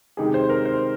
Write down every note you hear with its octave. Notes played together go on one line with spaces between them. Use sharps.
C3 D#3 G#3 D#4 G4 G#4
C5
A#4
C5